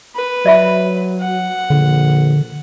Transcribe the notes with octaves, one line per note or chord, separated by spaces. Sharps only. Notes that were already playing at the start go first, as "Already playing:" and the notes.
B4
F#3 D5 E5 B5
F#5
A#1 D3